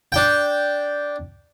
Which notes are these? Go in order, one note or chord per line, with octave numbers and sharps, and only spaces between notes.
D4 G5